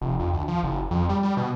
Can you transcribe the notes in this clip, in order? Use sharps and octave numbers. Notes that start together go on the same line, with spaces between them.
F1
F2
D2
F3
F#1
F2
G3
G3
B2